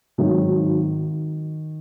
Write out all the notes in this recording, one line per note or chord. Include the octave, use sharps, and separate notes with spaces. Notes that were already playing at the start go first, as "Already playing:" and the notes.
G#1 G#2 D#3 F#3 D#4